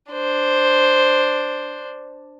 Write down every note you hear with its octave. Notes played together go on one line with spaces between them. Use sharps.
D4 C5